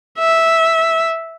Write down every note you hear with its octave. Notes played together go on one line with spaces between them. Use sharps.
E5